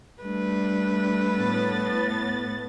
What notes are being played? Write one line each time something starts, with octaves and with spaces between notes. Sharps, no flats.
G3 A3 D4 B4
A2 B3 A6